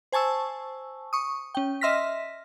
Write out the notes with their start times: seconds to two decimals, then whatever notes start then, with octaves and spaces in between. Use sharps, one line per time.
0.12 C5 G#5 A5 C#6 E6
1.13 C#6 D#6
1.55 C#4 G5
1.81 D#5 E5 C6 F6 A#6 B6